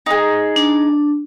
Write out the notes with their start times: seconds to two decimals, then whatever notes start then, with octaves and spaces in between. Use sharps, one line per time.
0.06 D#4 G#4
0.56 D4